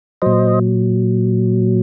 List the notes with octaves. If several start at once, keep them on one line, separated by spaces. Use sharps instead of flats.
A#2 F#3 C5 D#5